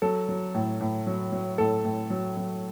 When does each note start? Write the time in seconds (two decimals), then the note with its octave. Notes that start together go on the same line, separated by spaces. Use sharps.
0.02 F#3 A4
0.29 F#3
0.54 A2
0.81 A2
1.07 F#3
1.32 F#3
1.58 A2 A4
1.84 A2
2.10 F#3
2.37 F#3